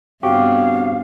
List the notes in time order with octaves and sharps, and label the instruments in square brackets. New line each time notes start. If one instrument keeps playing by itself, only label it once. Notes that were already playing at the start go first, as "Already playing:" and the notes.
[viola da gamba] G2 C#3 B3 [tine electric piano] C4 F#4 G4 [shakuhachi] F5